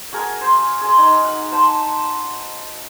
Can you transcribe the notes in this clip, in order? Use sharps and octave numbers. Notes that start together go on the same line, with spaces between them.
F#4 G#4 A#4 G#5
C5
G#4 C6
D#4
F#5
C5 A5